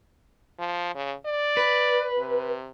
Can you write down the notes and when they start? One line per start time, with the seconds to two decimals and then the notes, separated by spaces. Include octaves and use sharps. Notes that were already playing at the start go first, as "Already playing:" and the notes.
0.59 F3
0.95 C#3
1.26 D5
1.57 B4
2.18 C3